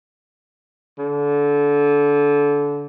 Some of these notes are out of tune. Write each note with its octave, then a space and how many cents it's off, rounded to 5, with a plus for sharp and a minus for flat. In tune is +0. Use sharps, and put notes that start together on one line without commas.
D3 -25